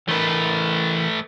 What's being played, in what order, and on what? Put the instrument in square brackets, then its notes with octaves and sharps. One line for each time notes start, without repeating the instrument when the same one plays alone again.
[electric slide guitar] E3 A#4 [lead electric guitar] A3 B4